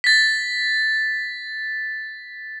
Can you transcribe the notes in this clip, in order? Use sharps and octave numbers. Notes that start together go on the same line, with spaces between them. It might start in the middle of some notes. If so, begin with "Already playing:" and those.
A6 B6